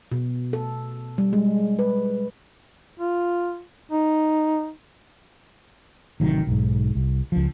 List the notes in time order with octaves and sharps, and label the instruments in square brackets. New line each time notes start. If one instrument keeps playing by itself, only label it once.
[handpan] B2
A4
G3
G#3
B4
[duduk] F4
D#4
[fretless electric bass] A1 C3 D#3 F#3
B1 G#2
C2
C#2 F3